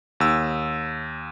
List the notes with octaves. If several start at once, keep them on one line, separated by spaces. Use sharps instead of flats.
D#2 E6